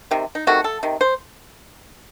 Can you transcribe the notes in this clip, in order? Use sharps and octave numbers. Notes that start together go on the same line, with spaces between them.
C3 D#3
D#4
C3 D#3 A3 F#4
A4
C3 D#3
C5